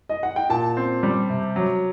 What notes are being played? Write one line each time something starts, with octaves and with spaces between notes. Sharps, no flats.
D#5
F#5
G5
A#2 A5
C4
G3
C3
F#3